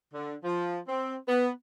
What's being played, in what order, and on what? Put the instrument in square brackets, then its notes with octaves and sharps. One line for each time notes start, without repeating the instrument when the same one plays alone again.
[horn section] D3
F3
C4
B3